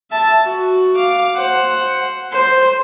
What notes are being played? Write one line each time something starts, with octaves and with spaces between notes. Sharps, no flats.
E5 A5
F#4
F5 D6
C5 F#5
C5